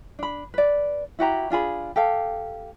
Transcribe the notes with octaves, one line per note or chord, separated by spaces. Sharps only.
D4 B5
B4 D5
E4 F#4 G4 A#5
D4 F4 G#4 B5
G4 A4 F5